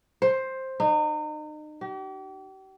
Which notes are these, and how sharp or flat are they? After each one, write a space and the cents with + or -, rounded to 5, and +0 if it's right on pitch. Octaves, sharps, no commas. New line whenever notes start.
C5 +10
D#4 -35
G4 -40